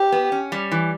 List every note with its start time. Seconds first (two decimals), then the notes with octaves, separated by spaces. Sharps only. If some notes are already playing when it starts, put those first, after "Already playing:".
Already playing: G4
0.12 B3
0.32 C#4
0.52 G3
0.71 E3